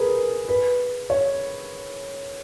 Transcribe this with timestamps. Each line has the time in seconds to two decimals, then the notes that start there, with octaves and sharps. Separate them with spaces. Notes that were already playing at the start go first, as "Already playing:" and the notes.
Already playing: G#4 A#4 B4
0.48 B4
1.10 C#5